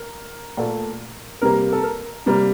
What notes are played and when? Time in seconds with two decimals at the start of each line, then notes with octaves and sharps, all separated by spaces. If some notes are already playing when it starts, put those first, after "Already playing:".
Already playing: A#4
0.57 A#2 A3
1.42 C3 G3 A#3 A#4
1.72 A4
1.83 A#4
2.26 C3 G3 A#3